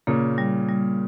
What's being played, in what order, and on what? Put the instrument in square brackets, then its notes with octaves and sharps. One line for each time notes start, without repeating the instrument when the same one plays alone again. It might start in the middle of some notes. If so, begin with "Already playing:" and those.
[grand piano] A#2 C#3 [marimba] A#3
[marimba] G3
G3